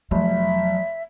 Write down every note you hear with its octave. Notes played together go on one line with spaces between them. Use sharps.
F1 F2 F#3 E5